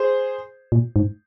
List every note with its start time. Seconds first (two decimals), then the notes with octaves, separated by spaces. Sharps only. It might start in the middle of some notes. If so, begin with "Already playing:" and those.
Already playing: G#4 C5
0.72 A#2
0.96 G#2